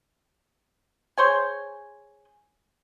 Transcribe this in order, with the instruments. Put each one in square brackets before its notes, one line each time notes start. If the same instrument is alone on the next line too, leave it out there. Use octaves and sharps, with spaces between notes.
[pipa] G#4 C5 C#5 G#5